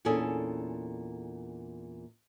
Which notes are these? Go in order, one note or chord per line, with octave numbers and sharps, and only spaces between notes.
E2 A#2 C#4 D4 G#4 A4